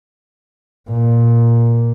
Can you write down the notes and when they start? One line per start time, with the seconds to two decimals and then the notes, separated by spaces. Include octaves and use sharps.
0.90 A#2